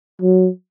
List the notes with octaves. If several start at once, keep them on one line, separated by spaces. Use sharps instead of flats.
F#3